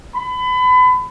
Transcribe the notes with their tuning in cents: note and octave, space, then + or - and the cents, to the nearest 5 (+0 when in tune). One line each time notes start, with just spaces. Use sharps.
B5 +30